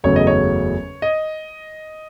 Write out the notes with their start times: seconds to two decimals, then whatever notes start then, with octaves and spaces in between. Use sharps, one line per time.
0.04 F#1 E2 C#3 F#3 A3 C#5
0.16 D#5
0.27 C#5
1.02 D#5